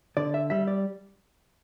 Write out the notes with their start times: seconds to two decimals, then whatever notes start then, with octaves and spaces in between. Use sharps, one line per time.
0.17 D3 D5
0.34 E5
0.50 G3 E5
0.67 D5